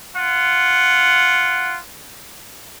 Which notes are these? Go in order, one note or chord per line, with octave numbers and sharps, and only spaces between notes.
F4 F#5